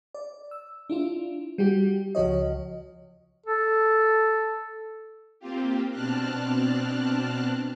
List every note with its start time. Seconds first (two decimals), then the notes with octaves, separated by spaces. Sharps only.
0.15 D5
0.51 E6
0.90 D4 E4 F4
1.58 G3 F#4 G4
2.15 C#2 F3 F#4 C#5 D#5
3.46 A4
5.40 A#3 C4 F4 G4
5.90 B2 C4 D4 A5 F6 F#6